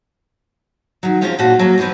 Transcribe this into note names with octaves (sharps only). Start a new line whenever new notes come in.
D#3 F#3
F3 G#3 C4 C#4 F4
A#2 C#4 F#4 A5
F#3 A#3
D2 E3 F3 B3 C4